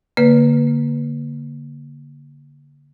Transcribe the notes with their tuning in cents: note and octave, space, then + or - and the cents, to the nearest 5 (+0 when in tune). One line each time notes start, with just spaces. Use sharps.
D3 -30 A#3 +0 B4 +0